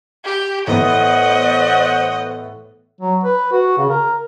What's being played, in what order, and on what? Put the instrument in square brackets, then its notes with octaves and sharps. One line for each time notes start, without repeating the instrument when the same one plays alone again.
[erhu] G4
[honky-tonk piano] A2 E3 B3 [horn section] C5 C#5 F#5 [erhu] D#5
[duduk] F#3
B4
F#4
C#3
A#4